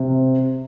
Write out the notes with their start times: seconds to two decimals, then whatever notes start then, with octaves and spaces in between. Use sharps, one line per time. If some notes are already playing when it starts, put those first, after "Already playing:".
Already playing: C3